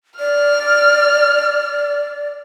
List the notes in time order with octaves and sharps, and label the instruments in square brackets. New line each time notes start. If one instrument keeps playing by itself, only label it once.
[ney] D5 [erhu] F6